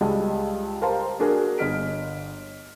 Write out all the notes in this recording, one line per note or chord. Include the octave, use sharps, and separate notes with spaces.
C#2 G3 G#4 D#5 A5
G4 A#4 C5 F5 A5 A#5
A#3 D4 F#4 G#4 A#4
G1 D#5 F6 B6 D7